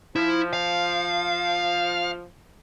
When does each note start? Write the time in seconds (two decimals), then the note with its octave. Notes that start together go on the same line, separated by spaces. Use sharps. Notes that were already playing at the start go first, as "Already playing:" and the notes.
0.16 F3 E4
0.53 F5